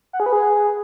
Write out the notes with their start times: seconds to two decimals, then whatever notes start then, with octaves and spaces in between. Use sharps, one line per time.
0.13 F#5
0.20 G#4
0.26 B4
0.33 G#4